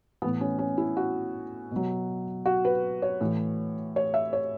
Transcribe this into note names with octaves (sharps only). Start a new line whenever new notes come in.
A2 E3 B3
C#4
C#4
E4
F#4
B2 F#3
F#4
B4
C#5
A2 E3
C#5
E5
C#5